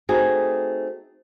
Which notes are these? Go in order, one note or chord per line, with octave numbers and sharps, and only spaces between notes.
A3 C4 D#4 F#4 G#4